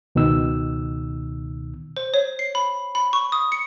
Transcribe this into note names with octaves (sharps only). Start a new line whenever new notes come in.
C#2 B2 D#3 E6
C5
C#5
C7
B5
B5
C#6
D#6
C#7